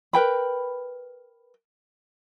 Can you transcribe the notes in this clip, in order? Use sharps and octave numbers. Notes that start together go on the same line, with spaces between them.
A#4 B4 G5 B5